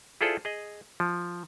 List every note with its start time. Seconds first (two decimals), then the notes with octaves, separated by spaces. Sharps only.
0.21 E4 F4 G#4 A4 C5 D5
0.45 G#4 D#5
1.00 F3